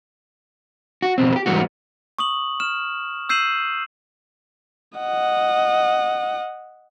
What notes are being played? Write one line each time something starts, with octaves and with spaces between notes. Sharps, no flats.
F#4
F2 B2 C4
G4 B4
G#2 E3 G3 B3 F#4
C#6 D#6 F#7
F6 E7
E6 G6 C7 D#7 E7 F#7
D#5 F#5